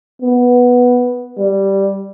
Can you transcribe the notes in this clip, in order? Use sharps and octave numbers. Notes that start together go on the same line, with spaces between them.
B3
G3